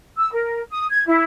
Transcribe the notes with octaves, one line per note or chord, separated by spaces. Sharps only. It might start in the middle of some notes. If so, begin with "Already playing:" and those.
E6
A#4
D#6
G#6
E4